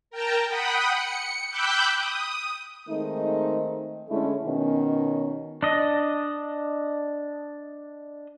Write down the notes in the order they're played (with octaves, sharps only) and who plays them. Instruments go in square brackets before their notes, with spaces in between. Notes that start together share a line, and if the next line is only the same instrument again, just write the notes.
[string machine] A#4 G5 A5 A#5
F#5 G5 B5 D#6
C#7
G5 B5 D6 E6 F#6 G6
D#6
[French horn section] D#3 G#3 A3 C4 D#4
D3 G#3 A3 C#4 E4
B2 D#3 C#4
[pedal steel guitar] D4 D#5